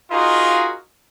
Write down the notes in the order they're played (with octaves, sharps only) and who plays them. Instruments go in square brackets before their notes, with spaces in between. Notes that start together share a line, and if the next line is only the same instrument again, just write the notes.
[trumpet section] D#4 F4 F#4 G#4 A#4 D#5